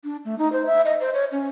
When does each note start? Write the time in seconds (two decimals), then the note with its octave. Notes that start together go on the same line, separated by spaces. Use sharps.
0.04 D4
0.25 A3
0.38 D#4
0.52 C5
0.66 E5
0.85 D#5
1.00 C5
1.14 C#5
1.32 C#4